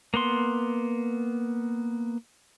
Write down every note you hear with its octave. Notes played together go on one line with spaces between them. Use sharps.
A#3 B3 C6